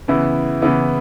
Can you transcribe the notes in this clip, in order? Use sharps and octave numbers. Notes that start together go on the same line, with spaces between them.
C#3 E3 B3 E4
C#3 E3 B3 E4